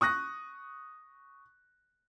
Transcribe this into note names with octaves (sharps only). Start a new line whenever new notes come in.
C#6 D#6 F#6 A#6